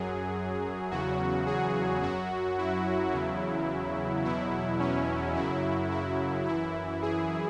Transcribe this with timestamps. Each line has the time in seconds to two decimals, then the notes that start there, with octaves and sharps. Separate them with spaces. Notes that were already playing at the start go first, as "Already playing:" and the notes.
Already playing: F#2 F#3 G#4
0.91 E2 C#3 F#3 F#4
1.46 G#4
2.03 F#2 F#3 F#4
2.58 E4
3.13 E2 C#3 F#3
4.24 E2 B2 F#3 E4
4.80 C#4
5.35 F#2 C#3 F#3 E4
5.91 E4
6.46 F#2 E3 E4
7.02 G#4